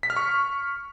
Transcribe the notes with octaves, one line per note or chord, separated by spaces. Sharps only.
B6
F6
C#6